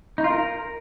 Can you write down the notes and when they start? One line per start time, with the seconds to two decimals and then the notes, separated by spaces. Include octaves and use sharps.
0.18 D#4
0.24 F4
0.30 A#4